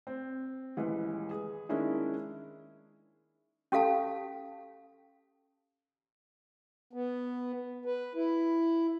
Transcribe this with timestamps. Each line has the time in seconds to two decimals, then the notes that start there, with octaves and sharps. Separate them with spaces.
0.07 C4
0.77 D#1 C#2 E3 B4
1.31 G#4
1.69 D#3 G#3 A#3 C#4 D4 E4
3.72 C#4 G4 A4 F5 A5
6.93 B3
7.85 B4
8.15 E4